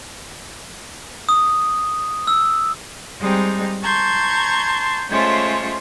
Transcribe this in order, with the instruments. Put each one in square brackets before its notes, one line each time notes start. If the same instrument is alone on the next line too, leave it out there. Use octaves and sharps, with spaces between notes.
[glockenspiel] D#6
E6
[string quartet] G3 G#3 C4 D#4
A5 A#5 C6 C#6 G6 G#6
G#3 A3 C#4 F4 C5 C#5